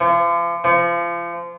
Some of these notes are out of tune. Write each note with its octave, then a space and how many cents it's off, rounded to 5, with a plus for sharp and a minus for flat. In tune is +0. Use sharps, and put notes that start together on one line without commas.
F3 -40
F3 -30